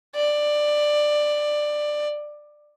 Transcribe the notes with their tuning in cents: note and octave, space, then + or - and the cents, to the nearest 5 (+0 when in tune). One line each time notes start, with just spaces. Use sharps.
D5 +15